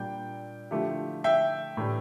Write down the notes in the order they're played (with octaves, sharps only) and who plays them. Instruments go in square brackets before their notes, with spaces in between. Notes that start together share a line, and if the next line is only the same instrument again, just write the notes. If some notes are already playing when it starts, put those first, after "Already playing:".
Already playing: [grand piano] A#2 G3 D4 [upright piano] G5
[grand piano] D3 F3 A3 E4 G4
[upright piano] E5 G5
[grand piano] A2 E3 A3 D4 G4